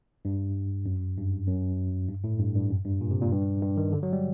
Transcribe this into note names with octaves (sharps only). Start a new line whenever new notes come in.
G2
F#2
G2
F#2
G2
A2
G2
G2
F#2
G2
A#2
C3
A#2
G2
G2
D#3
D3
F#3
G3